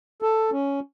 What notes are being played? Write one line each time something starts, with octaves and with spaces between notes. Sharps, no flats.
A4
C#4